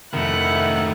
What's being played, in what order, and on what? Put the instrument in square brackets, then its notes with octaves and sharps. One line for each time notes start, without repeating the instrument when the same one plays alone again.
[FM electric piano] F2 C3 [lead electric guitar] D#3 A3 [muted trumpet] E4 [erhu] F#5